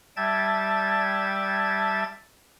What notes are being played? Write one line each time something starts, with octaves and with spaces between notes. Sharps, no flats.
G3 E5 G5 A5 G#6 A6